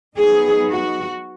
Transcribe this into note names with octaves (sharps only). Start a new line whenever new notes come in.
F#3 B3 D#4 G#4
F#4